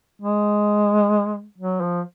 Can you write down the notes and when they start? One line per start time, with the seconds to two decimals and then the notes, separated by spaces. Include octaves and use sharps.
0.22 G#3
1.58 F#3
1.81 F3